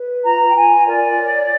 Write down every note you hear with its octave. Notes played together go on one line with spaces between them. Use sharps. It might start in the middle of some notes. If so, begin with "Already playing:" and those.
Already playing: B4
F4 A#5
G5
F4 G#5
A#4 D5
C#5